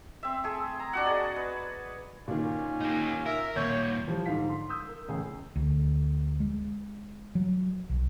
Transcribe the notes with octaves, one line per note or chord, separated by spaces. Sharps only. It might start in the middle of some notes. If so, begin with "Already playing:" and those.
C4 E5
A3 G#4
A#5
D4 F#4 F#5
G#4 D5 D#5
B4
A#2 D#3 C#4
D#4 G4
A#4 E5
D#2 A#2 C#5 G6
E3 F3 G3
G#2 D3 F3 D#4 F5 B6
C6
D#6 E6 G6
A#4
C#2 A2 C#3 E3 G#4
D2
G#3
F#3
B1